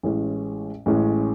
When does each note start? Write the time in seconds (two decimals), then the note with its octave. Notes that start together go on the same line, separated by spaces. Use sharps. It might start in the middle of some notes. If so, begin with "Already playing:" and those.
0.03 A1 A2 G#3 C#4
0.86 A1 A2 G#3 C#4